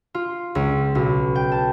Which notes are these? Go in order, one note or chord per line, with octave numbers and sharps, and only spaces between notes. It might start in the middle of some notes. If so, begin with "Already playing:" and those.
F4
C#2
B1
G5
A5